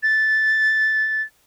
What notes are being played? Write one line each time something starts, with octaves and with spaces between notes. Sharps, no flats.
A6